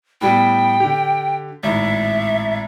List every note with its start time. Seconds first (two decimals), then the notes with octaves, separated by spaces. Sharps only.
0.21 A2 G3 B3 G5
0.80 D3 G4
1.63 G#1 A2 E5